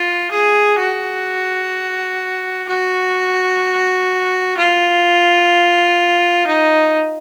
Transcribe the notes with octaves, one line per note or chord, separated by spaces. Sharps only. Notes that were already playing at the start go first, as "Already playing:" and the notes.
Already playing: F4
G#4
F#4
F#4
F4
D#4